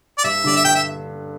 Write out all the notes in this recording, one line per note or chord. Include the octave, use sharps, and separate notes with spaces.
D5
G2 E5
D3 G3 D4 D5
E5
G2 G5
E5